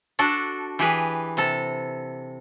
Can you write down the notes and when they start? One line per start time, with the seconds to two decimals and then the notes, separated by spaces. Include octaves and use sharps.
0.19 D4 F#4 A4
0.79 E3 G4 G#4 B4
1.37 C3 A4